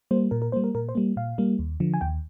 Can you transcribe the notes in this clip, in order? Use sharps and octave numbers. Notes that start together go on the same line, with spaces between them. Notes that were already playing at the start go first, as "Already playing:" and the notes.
G3 A#3 C5
A#2 A#4
A#4
G3 A#3 C5
A#4
A#2 A#4
C5
G3 A#3
A#2 F5
G3 A#3
D#2
D3 F3
G#5
D#2 G5